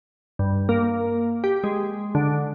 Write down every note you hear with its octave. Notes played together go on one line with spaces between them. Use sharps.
G2
A#3
G4
G#3
D3